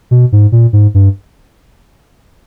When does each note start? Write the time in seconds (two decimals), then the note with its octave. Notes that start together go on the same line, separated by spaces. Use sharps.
0.11 B2
0.32 G#2
0.52 A#2
0.73 G#2
0.94 G2